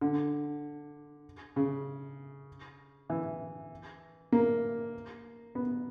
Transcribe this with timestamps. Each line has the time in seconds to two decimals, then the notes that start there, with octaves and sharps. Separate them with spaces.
0.01 D3
1.56 C#3
3.10 E3
4.32 A#3
5.55 B3